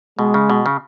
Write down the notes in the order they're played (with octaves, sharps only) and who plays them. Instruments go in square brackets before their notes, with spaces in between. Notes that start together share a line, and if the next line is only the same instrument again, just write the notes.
[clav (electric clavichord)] B2 [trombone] G#3
[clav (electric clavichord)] C#3
B2
C#3